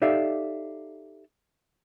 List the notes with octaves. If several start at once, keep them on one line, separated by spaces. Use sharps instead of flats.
D#4 G4 A4 D5 E5 F5